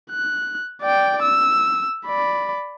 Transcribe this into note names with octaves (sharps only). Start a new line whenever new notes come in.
F#6
D5 G5
E6
D5 B5